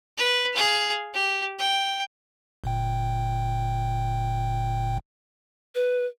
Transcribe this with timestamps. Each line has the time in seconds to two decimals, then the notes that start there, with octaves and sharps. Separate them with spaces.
0.18 B4
0.53 G#4 F5
1.14 G4
1.59 G5
2.64 G1 A#2 G5
5.75 B4